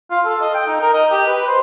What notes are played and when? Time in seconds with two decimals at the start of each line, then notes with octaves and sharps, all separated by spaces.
0.11 F4
0.25 A4
0.40 D#5
0.55 G5
0.67 D#4
0.81 A#4
0.93 D#5
1.11 G4
1.27 B4
1.48 C5